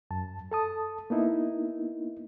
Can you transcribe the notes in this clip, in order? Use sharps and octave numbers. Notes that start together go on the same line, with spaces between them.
F#2 A5
A4 A5 D#6
A#3 B3 D#4 E4